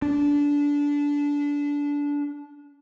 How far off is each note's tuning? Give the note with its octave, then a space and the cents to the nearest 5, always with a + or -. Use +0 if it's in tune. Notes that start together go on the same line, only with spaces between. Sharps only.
D4 -20